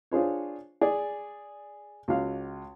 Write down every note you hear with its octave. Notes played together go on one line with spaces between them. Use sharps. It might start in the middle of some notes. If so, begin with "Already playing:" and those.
D4 F4 G#4 C5 C#5
G#4 D5
C#2 F#4 F5